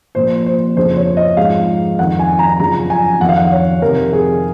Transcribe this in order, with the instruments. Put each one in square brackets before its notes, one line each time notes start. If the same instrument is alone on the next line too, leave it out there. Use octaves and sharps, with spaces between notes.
[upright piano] A#2 F3 C5
C5
F2 C#3 F3 C5
C#5
D#5
G#2 F3 F5
F2 D#3 F#5
G#5
A#5
F#2 C#3 F3 A#5
G#5
F2 D#3 F#5
F5
F#5
C#5
F2 C3 D#3 A#4
G#4